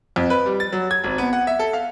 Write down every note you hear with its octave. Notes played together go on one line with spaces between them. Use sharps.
F2
B4
G3
A6
F#3
G#6
G#1
B3
F#5
E5
A4
F5